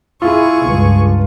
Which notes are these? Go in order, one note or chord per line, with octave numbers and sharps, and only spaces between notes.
E4 F4 G#4 C#6
C#2 G2